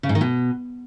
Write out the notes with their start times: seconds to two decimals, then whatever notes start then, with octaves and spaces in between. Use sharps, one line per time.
0.03 C#3
0.09 G#2
0.15 D#3
0.21 B2